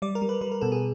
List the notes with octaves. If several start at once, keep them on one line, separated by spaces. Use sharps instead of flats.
G3 D5
A#4
G3
B4
G3 B4
A#4
B2 A4
G#4